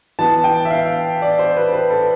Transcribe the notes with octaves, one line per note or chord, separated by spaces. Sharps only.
E3 B3 A5
G5
E5
F5
D5
C5
B4
B4
A4